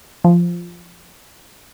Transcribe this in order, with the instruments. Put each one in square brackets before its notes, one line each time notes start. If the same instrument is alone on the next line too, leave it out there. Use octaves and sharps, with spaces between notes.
[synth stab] F3